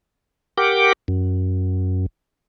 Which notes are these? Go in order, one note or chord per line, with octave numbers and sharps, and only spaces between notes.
G4 A#4 F#5 G5 D6
F#2